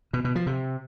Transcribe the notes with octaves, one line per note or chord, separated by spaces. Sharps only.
B2
B2
F3
C3